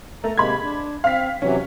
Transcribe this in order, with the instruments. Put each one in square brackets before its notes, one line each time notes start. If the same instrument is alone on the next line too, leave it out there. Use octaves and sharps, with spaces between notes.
[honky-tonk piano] A3 [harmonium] A#5
[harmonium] C3 G#3 A#3 [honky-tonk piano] B5 G#6
[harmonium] D4
[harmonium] C4 [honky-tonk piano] F5 B6
[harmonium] C3 E3 F#3 [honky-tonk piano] C#4